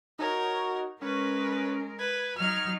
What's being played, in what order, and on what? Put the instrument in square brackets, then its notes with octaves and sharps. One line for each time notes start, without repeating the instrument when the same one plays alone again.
[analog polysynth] D#4 F#4 C#5 [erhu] A#4
[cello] G#3 A#4 [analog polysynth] C#4 [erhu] B4
[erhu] B4 [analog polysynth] G#6
[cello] F#3 D#4 [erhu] F6